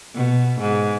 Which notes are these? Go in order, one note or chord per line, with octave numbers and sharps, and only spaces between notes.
B2
G#2